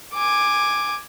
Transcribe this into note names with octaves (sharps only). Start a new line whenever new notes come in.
G#5 D6